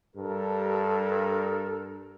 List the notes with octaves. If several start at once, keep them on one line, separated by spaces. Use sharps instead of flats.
G2 G4 A4 A#4